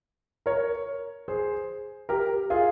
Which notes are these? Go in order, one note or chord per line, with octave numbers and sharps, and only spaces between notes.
A#4 C#5
G#4 C5
G4 A#4
F4 G#4